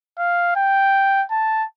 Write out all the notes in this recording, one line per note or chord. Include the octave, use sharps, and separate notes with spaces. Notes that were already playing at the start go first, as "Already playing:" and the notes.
F5
G5
A5